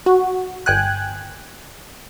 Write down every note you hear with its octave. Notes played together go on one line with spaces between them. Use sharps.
F#4
G1 G5 G#5 F#6